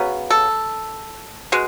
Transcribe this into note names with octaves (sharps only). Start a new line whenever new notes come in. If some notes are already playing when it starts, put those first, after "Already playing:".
Already playing: C#3 F#3 B3
A4
B2 G#3